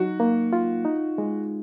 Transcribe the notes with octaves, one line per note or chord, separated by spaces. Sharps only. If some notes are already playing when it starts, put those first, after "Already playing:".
Already playing: F#3 D#4 F#4
A#3
F4
D#4
G#3